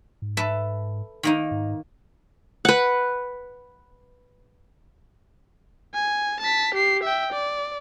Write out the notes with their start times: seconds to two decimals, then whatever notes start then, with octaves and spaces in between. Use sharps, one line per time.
0.22 G#2
0.37 A4 B4 E5
1.23 D#3 A#3 D#4
1.51 G#2
2.65 B4 F#5
5.94 G#5
6.40 A5 B6
6.74 G4 C7
7.03 E5 G5
7.33 D5